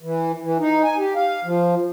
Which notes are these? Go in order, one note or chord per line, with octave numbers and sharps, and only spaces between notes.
E3
E3
D#4
G#5
G4
F5
F3